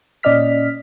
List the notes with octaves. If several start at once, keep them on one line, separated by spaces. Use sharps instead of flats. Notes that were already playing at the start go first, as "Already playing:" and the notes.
A#2 C#4 D5 D#5 F6 B6